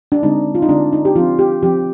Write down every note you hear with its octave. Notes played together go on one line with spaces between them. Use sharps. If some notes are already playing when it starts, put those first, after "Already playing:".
D4
D3 G#3 C4 D#4
F4
D#4
D3 G#3 C4 D4
D#4
G4
F3 C4 F4
G4
F3 C4 G4